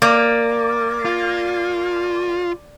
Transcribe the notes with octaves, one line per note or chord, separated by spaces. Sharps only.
A#3 D5
F4